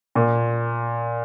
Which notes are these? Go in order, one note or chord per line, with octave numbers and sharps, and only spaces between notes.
A#2